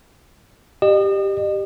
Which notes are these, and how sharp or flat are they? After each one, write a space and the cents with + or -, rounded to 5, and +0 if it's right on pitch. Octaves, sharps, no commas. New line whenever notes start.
G4 +0 D#5 -40